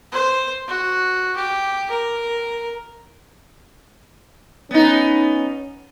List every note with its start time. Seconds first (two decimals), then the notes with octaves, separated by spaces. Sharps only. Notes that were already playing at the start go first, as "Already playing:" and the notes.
0.12 C5
0.68 F#4
1.36 G4
1.90 A#4
4.71 B3 C#4 D#4